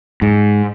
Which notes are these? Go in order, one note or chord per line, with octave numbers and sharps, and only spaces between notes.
G#2